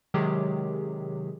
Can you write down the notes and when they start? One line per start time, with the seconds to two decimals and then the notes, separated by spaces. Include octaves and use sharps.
0.14 C3 D#3 F#3 G#3 G4 G#4